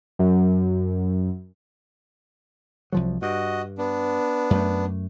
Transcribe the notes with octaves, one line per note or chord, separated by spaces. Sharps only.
F#2
C2 F3 F#3
G2 F#4 D#5
B3 D4
F#2 A3